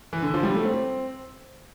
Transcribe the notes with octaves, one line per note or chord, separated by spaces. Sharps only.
E3
D3
F3
G3
A3
C4